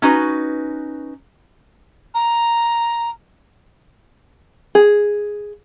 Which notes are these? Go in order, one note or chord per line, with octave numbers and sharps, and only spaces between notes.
C#4 D#4 F#4 B4
A#5
G#4